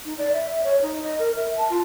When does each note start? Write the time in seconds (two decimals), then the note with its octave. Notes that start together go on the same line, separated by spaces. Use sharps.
0.05 D#4
0.18 D5
0.32 E5
0.64 C#5
0.82 D#4
1.03 D#5
1.19 A#4
1.36 E5
1.57 A5
1.70 F4